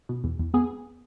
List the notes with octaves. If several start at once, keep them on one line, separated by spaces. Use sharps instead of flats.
B2
E2
E2
B3 G#4